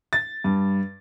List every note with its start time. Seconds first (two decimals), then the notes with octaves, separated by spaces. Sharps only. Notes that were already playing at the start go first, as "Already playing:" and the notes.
0.13 A6
0.44 G2